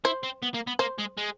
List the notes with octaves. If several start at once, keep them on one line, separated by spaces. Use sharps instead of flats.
E4 C5
C4
B3
A#3
B3
A#3 C5
G#3
G#3